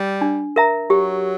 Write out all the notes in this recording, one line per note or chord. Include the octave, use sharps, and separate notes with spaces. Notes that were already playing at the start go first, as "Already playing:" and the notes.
Already playing: G3
D4
A#4 E5 A#5
F#3 G4